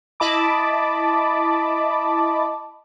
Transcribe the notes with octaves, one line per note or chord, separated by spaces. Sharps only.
E4 D#5 A5 B5 D6